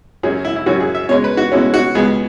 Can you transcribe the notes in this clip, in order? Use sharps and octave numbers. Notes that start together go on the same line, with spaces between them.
F#2 F#3 C#4 G#4
E4
E4
F#2 F#3 C#4 F#4
G#4
E5
B2 G#3 C#4 C#5
B4
F#4
B2 G#3 C#4 E4
F#4
C#2 B2 B3 G#4